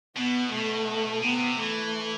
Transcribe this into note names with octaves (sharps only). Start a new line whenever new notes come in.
B2 B3
B2 A3
C3 B3
E3 A3